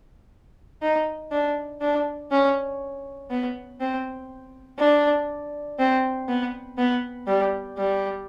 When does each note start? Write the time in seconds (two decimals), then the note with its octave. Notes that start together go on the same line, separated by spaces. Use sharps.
0.82 D#4
1.31 D4
1.81 D4
2.31 C#4
3.30 B3
3.80 C4
4.79 D4
5.79 C4
6.28 B3
6.78 B3
7.27 G3
7.78 G3